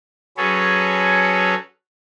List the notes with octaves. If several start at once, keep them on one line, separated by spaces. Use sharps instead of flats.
F#3 C#4 G#4 A4 B4 C#5